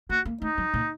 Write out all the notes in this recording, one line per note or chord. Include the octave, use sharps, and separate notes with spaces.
A#3 F#4
A#3
A3 D#4
F#3
A#2